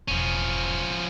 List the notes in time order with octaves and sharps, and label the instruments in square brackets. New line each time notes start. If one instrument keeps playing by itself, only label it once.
[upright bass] E1 A1 [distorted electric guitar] F3 C#4